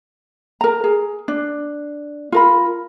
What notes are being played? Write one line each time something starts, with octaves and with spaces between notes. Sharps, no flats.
A#4 A#5
G#4
D4
F4 A#4 B5